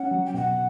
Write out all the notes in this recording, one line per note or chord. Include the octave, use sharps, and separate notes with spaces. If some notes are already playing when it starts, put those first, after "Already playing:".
Already playing: C#4 F#5
F#3
G5
B2 F#5